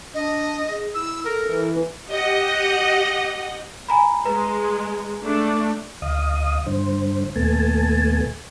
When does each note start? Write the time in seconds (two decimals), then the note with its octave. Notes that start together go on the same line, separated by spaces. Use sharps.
0.14 D4 D#5
0.69 G#4
0.94 E4 E6
1.25 A4 A#4
1.46 E3
2.10 G4 D#5 F#5
3.89 G#5 A#5 B5
4.25 G#3 B4 A#5
5.24 A3 D4
6.02 D2 D#5 F5 D#6
6.66 G2 D3 C5
7.36 D#2 A#2 A3 B3 G#5 A5